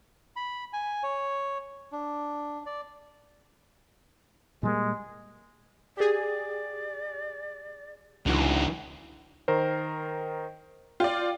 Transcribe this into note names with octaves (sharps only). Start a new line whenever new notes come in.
B5
G#5
C#5
D4
D5
A#2 G3 G#3 A#3
G4 G#4 D5
C#2 D3 E3 F#4
D#3 A#4 C5
F4 D5 G5